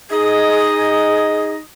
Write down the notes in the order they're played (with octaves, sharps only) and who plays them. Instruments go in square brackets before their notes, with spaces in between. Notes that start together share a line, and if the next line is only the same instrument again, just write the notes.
[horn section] D#4 D#5 [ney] G#4